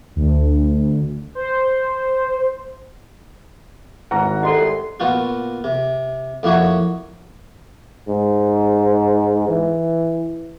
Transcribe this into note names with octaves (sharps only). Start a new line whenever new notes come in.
D2
C5
G#1 E4 G#4 B4 F#5 A#5
C2 A4 D5 D#5 C6
A#2 B3 F4 F#4
C3
F2 A#3 E4 F#4 C#5
G#2
E3